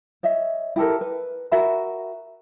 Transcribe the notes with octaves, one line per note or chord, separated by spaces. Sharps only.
C#5 D#5 E5
E4 G4 A4 A#4
B4
F#4 A#4 E5 B5